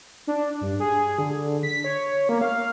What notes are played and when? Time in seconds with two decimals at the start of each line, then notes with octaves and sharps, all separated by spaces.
0.27 D4
0.61 G2
0.80 G#4
1.19 D3
1.63 B6
1.84 C#5
2.29 A#3
2.41 F5